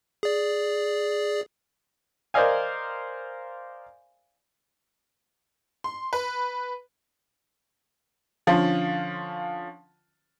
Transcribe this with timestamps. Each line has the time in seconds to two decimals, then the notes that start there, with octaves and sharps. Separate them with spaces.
0.23 G#4 D5
2.34 A#4 C5 D5 D#5 F5 G#5
5.84 C6
6.13 B4
8.47 D3 F3 C#4 F4